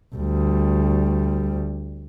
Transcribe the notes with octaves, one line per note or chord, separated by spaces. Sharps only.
D2 G3